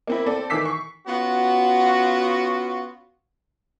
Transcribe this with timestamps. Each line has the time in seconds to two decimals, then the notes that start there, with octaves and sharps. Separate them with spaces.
0.07 A#3 C4 E4
0.26 C4 A4 D5
0.50 D#3 E3 D6 E6 B6 C7
0.65 C#6
1.07 B3 C#4 F4 F#4